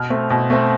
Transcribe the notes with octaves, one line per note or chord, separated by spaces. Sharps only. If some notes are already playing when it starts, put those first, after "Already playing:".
Already playing: B2 F6
A3 C4
B2
A3 C4